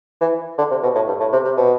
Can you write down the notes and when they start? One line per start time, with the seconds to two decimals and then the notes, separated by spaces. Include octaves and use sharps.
0.21 E3
0.58 D3
0.71 C3
0.83 B2
0.95 A2
1.08 G2
1.20 A2
1.32 C3
1.45 C3
1.57 B2